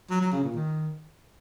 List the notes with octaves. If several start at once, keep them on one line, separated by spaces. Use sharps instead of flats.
F#3
F#3
C#3
A#2
D#3